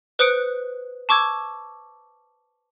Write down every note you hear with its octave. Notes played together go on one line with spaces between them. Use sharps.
B4 C5 D#6 F#6 C#7 D7
A5 C#6 D6 E6 G#6